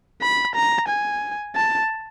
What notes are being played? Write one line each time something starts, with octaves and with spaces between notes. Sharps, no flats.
B5
A#5
G#5
A5